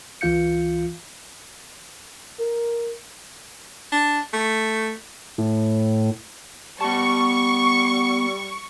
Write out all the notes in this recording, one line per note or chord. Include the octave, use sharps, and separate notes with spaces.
C#2 E3 F4 F5 G6 C#7
A#4
D4
A3
A2
G3 B3 A5 C#6